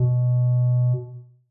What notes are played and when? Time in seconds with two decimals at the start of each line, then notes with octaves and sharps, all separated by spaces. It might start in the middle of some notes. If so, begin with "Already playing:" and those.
Already playing: B2